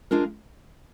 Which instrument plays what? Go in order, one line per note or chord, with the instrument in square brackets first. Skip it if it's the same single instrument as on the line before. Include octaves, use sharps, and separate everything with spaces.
[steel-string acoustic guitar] G#3 D4 F4 A#4 F5